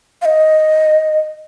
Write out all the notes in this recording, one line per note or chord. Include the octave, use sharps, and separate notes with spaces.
F5
D#5